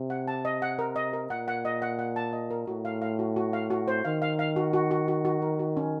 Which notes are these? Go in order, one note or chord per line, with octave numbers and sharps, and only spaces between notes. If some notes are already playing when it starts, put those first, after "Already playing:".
Already playing: C3
F#5
A5
D#5
F#5
A#4
D#5
A#4
A#2 F#5
F#5
D#5
F#5
F#5
A5
D#5
A#4
A2 F#4
F5
F5
F#4
F#4
F5
F#4
C5
D#3 F5
F5
F5
F#4
F#4
F#4
F#4
F#4
A#4
F#4
C#4